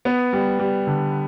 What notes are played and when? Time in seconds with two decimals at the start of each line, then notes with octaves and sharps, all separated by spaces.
0.05 B3
0.33 G3
0.60 G3
0.87 D3